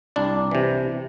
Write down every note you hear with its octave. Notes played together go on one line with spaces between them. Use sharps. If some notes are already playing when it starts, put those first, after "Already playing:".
C2 D4 D5
C3 E3